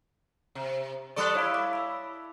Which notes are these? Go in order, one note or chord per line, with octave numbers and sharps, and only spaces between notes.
C3
G3 A4 D5 C#6 D#6 F#6
E4 C#5 F5 B5
D6
B5 E6